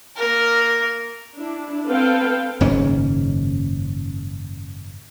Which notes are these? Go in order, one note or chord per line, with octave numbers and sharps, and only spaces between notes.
A#3 A#4
D4 E4
B3 C4 A4 B4 F5 G5
F#1 G#2 D#3 C#4